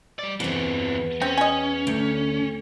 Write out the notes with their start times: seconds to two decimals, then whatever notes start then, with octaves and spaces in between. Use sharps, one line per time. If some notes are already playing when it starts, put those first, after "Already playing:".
0.19 G3 D5
0.40 E2 E3 B3 C4
1.22 C4 C#4
1.38 D#5 G#5
1.87 D2